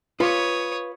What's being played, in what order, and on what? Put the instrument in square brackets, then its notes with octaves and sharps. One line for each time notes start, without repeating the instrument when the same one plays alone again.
[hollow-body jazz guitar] F4 [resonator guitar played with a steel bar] B4 [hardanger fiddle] C#5 D#6